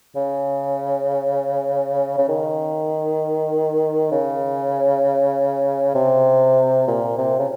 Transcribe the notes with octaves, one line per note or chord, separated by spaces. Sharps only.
C#3
C#3
D#3
C#3
C3
A#2
C3
C#3